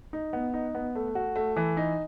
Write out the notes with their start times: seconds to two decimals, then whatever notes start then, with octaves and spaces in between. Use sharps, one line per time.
0.13 D#4
0.33 B3
0.54 D#4
0.75 B3
0.95 A3
1.15 F#4
1.36 A3
1.56 E3
1.77 D#4